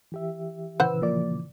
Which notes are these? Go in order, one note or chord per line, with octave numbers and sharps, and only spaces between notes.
E3 G4 E5
A#2 C#3 E3 B4 C5 F#5 E6
F3 A#3 D5